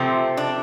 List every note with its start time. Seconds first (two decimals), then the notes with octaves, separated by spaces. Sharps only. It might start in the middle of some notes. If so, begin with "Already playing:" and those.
Already playing: C3 F3 A3 C4
0.37 D4